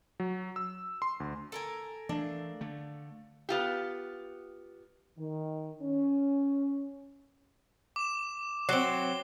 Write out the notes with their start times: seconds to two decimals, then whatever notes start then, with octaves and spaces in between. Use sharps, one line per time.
0.20 F#3
0.56 E6
1.02 C6
1.20 D2
1.52 A4 A#4 G#5
2.09 E3 A3 D4 F5
2.61 D3 A3
3.49 B3 F4 G4
5.17 D#3
5.82 C#4
7.96 D6 E7
8.69 F#3 C4 C7 G7